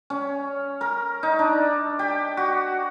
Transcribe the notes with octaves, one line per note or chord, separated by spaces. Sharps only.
C#4
A#4
D#4
D4
G4
F#4